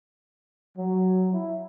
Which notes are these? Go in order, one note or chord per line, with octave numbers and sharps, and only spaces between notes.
F#3
E4